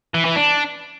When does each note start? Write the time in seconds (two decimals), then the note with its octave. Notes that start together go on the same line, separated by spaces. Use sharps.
0.14 E3
0.25 E3
0.36 D4